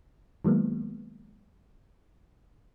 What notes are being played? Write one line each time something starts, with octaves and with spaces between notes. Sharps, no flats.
D#3 F#3 G#3 A#3 B3